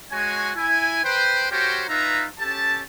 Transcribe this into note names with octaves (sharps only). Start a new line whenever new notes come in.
G#3 F#4 C#5 G#5
E4 G#5
B4 C5 G5
F#4 G4 A#4 C5 C#5 G5
D#4 F4 B4 E5 F5 A#5
C#4 G4 A4 A5